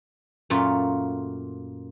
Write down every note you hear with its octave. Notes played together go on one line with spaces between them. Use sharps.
F#2 A#2 A3 F4